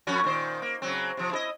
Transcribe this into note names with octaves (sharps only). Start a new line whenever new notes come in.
F2 C#4 F#4
A#2 D#3 C5
A#3
C#3 F#3 C4
C3 F3
E4 G#4 D#5